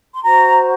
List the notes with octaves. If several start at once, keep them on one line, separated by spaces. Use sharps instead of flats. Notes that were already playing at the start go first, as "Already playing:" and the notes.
C6
F#4 C5 A#5